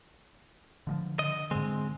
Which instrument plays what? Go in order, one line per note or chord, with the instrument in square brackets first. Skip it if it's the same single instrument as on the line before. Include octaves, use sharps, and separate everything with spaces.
[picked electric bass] D3 E3 F3
[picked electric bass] D3 [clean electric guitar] D#5
[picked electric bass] G#2 D3 [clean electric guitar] G#3 C4